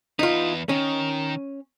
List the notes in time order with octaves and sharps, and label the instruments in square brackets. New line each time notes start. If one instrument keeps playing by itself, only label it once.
[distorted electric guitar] E2 B4 [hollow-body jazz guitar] D#4 F4
[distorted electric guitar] D#3 [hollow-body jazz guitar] C#4